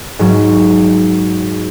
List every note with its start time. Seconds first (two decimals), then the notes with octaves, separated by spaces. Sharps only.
0.19 G#2 F#3